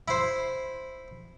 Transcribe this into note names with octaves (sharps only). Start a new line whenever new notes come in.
E4 C5